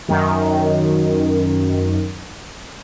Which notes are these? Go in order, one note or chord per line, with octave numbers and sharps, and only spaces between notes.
F#2 D#3